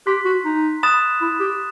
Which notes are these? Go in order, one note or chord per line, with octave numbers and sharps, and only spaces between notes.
G4 C6 F#6 B6
F#4
D#4
B5 D#6 F#6 A6 E7
E4
G4